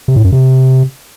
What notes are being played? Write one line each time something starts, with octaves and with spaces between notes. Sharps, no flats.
C3
A2
F#2
C3